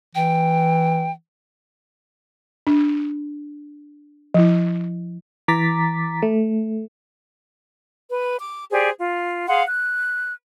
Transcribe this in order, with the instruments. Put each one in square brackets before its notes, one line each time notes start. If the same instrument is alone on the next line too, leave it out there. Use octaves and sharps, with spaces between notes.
[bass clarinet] E3 [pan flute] G5
[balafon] D4
F3 E4
[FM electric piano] E3 A#5 D6 A6 B6
A3
[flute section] B4
D6
G4 G#4 C5 D5
F4
G#4 F5 F#5 C6
F#6